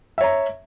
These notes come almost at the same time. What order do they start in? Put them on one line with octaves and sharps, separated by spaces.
E5 C#5 A#5